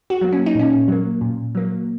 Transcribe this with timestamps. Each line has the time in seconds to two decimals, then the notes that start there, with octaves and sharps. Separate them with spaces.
0.10 F#4
0.21 F#3 A#3
0.33 C#4
0.46 D#4
0.55 A#2 C#4
0.88 F#3 A#3
1.21 A#2
1.55 F#3 A#3